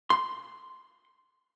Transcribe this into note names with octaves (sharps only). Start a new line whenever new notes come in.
C6